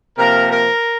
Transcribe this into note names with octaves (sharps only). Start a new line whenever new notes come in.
C3 F3 A#3 A#4
A#4